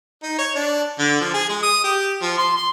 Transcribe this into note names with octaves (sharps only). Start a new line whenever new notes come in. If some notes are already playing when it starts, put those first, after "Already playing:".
D#4
C#5
D4
D3
F3
G#4
G#3
D#6
G4
F3
C6
C6